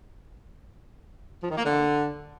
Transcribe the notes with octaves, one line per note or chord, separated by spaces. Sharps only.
F3
D#3
A#3
D3